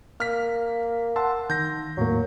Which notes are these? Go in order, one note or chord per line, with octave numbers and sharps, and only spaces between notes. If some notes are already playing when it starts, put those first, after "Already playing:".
A#3 F6 B6
F#5 A5 C6 E6
D#3 G6 A#6
E2 A2 F#3 A#3